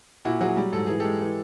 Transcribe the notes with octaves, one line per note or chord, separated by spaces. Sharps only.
A#2 E4 F#4
F#3 F#4 G#4
G3
G#2 A4
E3 G#4
G#3 G4 A4
E3